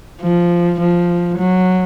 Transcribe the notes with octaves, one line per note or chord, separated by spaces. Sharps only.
F3
F3
F#3